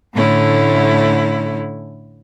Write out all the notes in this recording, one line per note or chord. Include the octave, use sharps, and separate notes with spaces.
A2 D3 A3 C#4 E4